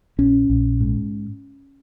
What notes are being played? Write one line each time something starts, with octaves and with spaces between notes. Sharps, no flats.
A#1 C#4
A#1
G#2